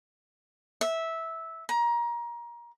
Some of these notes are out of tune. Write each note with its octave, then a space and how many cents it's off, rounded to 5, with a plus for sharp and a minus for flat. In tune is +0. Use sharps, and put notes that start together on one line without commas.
E5 -10
A#5 +25